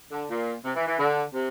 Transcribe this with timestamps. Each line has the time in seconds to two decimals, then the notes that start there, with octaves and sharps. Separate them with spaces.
0.11 D3
0.29 A#2
0.64 C3
0.75 E3
0.87 E3
0.98 D3
1.33 C3